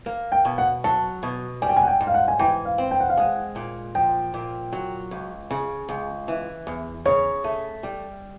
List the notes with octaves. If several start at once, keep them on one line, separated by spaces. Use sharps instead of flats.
A#3
G5
B2
F#5
F#3 A5
B2
G3 G#5
G5
G#5
F#5
G5
G#2
F5
F#5
G#5
E3 G5
F5
C4
G5
F#5
F5
G#3 F#5
A#2
F3 G5
A#2
F#3
C#2
C#3
C#2
E3
E2
C#3 C#5
A3
G3